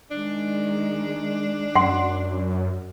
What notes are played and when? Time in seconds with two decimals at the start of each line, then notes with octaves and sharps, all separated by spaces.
0.11 D#3 G#3 D4
1.75 F#2 F#5 C6